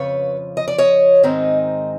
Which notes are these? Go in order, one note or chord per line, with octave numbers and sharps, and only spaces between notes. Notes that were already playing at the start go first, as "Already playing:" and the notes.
Already playing: F2 C#3 F3 B4 C#5
D#5
D5
C#5 D#5
G#2 D#3 G#3 C4 D#4